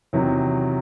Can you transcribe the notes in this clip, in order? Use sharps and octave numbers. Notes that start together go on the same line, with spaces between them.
E2 C3 D#3 F#3